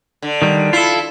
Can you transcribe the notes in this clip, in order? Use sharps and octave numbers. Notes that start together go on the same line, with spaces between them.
D3
D#3 G3
E4 F4 A4